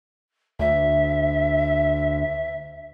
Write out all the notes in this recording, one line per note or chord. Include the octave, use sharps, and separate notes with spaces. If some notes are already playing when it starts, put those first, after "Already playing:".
D2 E5